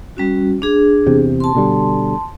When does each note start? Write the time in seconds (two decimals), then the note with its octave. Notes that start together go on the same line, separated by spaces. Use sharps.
0.17 G3 C#4 F#4
0.62 D4 G#4
1.06 E2 C3
1.40 A5 C6
1.55 B2 D3 G3